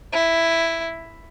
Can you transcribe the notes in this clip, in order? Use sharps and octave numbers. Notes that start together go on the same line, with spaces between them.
E4